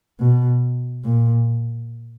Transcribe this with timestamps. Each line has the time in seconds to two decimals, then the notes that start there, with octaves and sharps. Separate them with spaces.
0.20 B2
1.04 A#2